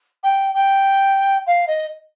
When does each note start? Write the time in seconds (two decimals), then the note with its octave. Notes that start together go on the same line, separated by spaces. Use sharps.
0.23 G5
0.55 G5
1.47 F5
1.67 D#5